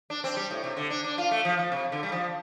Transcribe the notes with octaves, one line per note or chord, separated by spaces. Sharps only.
D4
C4
G3
A2
C3
D3
D4
D4
F4
A3
F3
F3
C3
D3
G3
F3